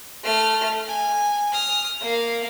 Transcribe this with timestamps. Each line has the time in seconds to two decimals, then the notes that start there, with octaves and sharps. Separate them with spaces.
0.23 A3 F6
0.88 G#5
1.52 D#6 F6
2.00 A#3 F5